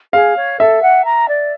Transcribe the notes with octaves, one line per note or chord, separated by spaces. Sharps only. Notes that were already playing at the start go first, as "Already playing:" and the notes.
G#4 F5
C#5
A4 E5
F#5
A#5
D5